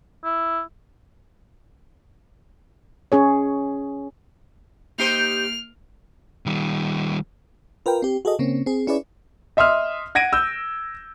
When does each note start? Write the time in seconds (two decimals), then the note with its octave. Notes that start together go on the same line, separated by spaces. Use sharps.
0.24 E4
3.12 C#4 G#4 C#5
4.98 A#3 D#4 G4 C5 F6 C7 D7
6.46 D#3 G3
7.86 F4 A#4 B4 G5
8.02 C4 G4
8.25 F#4 G#4 A4 D#5
8.39 C#3 A#3 C4 C#4
8.66 C4 G#4
8.87 C#4 E4 G#4 B4 C#5 D5
9.57 D#5 E5 C6 D#6 F6
10.15 F#5 G#6 A#6 D7 D#7
10.33 E6 G6